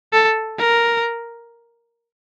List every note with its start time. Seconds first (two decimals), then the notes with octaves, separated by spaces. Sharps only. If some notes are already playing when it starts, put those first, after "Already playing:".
0.13 A4
0.59 A#4